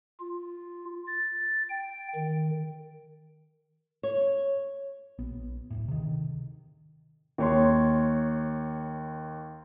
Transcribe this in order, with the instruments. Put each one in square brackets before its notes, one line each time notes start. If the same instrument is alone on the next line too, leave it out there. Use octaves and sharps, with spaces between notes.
[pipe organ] F4
A6
G5
D#3
[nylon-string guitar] C#5
[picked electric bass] A#1 B3
D1 G1 A2
C3 D#3
[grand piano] D#2 C#5 C6